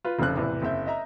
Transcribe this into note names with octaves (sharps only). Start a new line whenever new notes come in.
F4 B4
F1 C#3 F3 C4 F#6
E2 A2 C3 E3
F#1 C4 E5 G6
D#5 E5 A#5